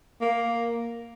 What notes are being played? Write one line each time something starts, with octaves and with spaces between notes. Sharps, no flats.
A#3